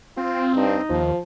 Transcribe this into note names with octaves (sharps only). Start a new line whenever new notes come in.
C4 F4
G2 D#4
D#2 F3